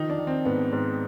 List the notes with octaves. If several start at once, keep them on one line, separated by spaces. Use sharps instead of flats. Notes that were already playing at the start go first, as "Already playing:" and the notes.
Already playing: D#3 F3 D#4
D4
D#3
C4
G#2 B3
G#2